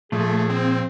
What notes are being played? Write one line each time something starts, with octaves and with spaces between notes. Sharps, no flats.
A#2 F3 A3 G#4
C4